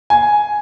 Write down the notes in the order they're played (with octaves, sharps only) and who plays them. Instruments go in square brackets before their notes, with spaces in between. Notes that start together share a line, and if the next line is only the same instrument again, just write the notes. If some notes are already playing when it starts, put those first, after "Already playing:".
[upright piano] G#5